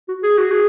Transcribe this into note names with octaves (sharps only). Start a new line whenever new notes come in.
F#4
G#4
F#4
G#4